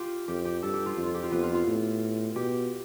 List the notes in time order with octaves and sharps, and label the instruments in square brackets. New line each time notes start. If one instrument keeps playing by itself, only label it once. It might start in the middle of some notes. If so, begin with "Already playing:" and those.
Already playing: [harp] F4 G4
[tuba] F2 [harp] G4
[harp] G4
[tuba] G2 [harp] A4
[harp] G4
F4
[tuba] F2
[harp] F4
G4
F4
[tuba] F2 [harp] B3
[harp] F4
F4
[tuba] A2
[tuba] B2 [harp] G4